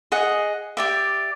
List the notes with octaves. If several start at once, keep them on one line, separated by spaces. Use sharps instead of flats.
G#4 D#5 F#5
G4 D5 E5